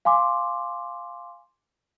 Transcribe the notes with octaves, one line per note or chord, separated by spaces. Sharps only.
F5 G#5 C6 D6